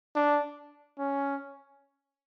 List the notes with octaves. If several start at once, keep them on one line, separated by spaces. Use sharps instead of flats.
D4
C#4